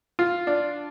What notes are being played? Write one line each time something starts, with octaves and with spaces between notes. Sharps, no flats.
F4
D4